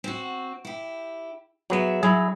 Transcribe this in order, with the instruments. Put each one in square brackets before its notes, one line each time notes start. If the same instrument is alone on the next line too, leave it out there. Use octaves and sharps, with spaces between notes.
[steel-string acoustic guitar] C4 F#4
E4 G4
[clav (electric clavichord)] F#3 B3 [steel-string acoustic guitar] G#4 E5
[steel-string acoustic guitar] F#3 [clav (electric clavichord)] E4 G#4